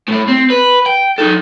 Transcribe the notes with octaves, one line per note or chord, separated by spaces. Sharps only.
A2 A3
C4
B4
G5
D#4 A4